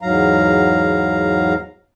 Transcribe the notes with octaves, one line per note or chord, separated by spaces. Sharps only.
E2 G#2 F#3 F5 A#5